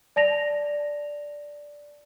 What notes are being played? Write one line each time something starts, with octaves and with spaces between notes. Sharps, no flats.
D5 A5 A#6 F7